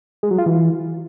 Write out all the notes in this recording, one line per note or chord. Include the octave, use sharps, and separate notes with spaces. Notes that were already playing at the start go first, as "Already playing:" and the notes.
G#3
F#3
F4
E3